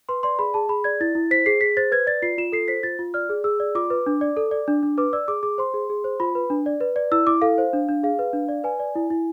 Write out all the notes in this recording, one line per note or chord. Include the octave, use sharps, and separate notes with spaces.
B4 C6
D5 C6
G#4 B5
G#4 A5
G#4 B5
D5 G#6
E4 A6
E4
C5 B6
G#4 C7
G#4 B6
C5 A6
B4 G#6
D5 A6
F4 C7
F4 E7
A4 C7
C5 B6
F4 A6
F4
D5 F6
G#4
G#4 E6
D5
F4 D6
B4
D4
D5
A4
D5
D4
D4
B4 D6
D5 E6
G#4 D6
G#4 D6
C5 C6
G#4
G#4
C5
F4 B5
B4
D4
D5
B4
D5
E4 E6
E4 D6
A4 F5
C5
D4
D4
G#4 F5
B4
D4
D5
B4 G#5
D5
E4
E4